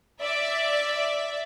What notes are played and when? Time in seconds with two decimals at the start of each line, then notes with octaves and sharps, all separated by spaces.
0.21 D5 E5